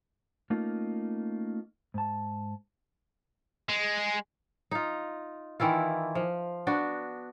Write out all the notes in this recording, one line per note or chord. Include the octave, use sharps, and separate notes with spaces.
A3 A#3 C#4 D#4 F4
G#2 A5
G#3
D#4 F4
D#3 E3 E4 F4
F3
B3 D4 F#4